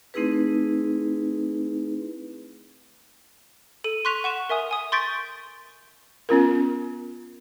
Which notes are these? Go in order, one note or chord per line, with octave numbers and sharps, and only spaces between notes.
A3 C4 D#4 E4 G#4 B4
A4 D#7
C6 C#6 F#6 B6 D#7 F7
F#5 C#6 E7
A#4 E5 G#5 D#6
G#5 D#6
C6 C#6 G6 A6 B6 D7
B3 C#4 F4 A#4